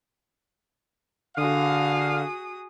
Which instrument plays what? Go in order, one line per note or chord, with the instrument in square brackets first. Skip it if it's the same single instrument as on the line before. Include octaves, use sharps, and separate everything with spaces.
[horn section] D3 F5 [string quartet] F#4 G#4 D#6